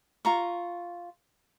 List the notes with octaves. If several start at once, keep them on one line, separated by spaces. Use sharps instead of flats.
F4 A#5 C#6